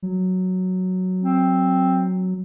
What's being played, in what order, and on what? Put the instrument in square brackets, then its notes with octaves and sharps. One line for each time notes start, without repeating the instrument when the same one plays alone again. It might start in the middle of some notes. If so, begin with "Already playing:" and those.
[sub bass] F#3
[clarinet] C4